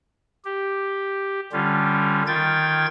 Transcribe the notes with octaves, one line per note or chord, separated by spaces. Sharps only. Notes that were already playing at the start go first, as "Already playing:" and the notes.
G4
D3 G3 C#4 F4
D#3 F4 G5 G#6 A6